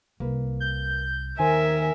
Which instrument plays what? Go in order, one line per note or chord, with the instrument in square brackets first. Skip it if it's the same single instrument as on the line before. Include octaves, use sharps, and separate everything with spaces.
[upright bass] C2 [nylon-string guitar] A#3 B4
[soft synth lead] G6
[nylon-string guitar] D#2 D#3 C5 [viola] A#4 E5 [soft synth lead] G#5